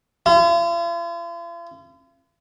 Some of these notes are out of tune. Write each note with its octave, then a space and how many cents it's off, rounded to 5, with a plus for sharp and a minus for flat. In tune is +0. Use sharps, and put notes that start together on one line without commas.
F4 -45